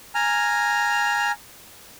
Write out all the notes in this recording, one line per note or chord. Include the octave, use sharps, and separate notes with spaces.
G#5 A#5 F6